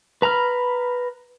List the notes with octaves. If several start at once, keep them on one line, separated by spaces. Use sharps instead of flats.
B4 A#5 B5 F6